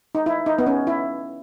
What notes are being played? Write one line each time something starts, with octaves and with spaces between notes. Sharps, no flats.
D#4
E4
D#4
B3
C#4
E4